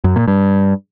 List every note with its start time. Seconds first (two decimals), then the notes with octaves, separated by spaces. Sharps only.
0.04 F#2
0.16 A#2
0.28 G2